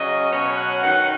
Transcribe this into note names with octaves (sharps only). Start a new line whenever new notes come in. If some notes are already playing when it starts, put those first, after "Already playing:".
Already playing: C#3 F#3 C#4 D#5
B2 F#3 C#4 C#5
F#5
F#2 D#3 F#3 D#4 F#5